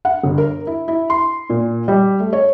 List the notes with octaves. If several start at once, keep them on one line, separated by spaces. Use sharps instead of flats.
F#5
G1
A#4
E4
E4
C6
A#2
G3
A3
C#5